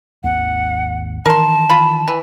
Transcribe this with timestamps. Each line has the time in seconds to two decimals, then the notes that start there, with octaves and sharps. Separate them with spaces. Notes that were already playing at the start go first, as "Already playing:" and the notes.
0.24 G#1 D#2 F#5
1.26 D#3 E3 A#4 A5 C6
1.69 F4 B5
2.08 E3